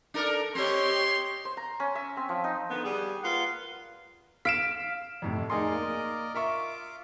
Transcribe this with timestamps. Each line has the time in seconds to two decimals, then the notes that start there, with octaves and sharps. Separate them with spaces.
0.14 D4 A4 A#4
0.55 C4 G4 C#5 D#5 C6
1.45 C5
1.57 A#5
1.80 C#4
1.95 E5
2.17 C4
2.29 F3
2.44 D#4
2.69 D3 D#3 B3
2.84 G3 G#4
3.23 A#3 F4 B4 F#5
4.45 F5 B6 D7 E7
5.22 F2 A2 C3
5.50 D#4 G#4 A#4 D5 D#5 C6
5.72 A#3
6.35 F4 A#4 E5 C#6 D6